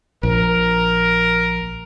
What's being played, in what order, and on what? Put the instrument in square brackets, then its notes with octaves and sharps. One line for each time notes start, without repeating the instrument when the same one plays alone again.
[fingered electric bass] A#1 [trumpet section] A#4